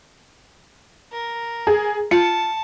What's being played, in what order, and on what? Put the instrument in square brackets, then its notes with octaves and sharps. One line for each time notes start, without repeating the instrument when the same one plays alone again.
[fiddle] A#4
[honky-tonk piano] G#4
[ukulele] F4 [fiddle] A5 [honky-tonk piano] C#7